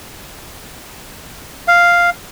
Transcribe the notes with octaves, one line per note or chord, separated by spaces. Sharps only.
F5